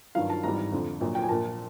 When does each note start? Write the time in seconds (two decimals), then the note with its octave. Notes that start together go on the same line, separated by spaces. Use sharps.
0.15 G2 D#3 F#3 F5
0.30 A5
0.43 G#1 G#2 E3 G3 A#5
0.72 F2 D3 F3
1.01 A#1 A#2 F#3
1.15 G5
1.23 G#5
1.29 A#1 A#2 F3 A#3 A5